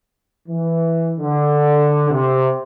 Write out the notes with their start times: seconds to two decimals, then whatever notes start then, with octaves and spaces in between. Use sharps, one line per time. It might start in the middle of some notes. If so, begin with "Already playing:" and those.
0.48 E3
1.19 D3
2.11 C3